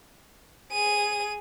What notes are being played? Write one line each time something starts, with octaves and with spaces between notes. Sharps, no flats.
G#4 D#7